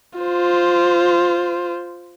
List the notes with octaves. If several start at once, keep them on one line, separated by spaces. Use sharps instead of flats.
F4 C5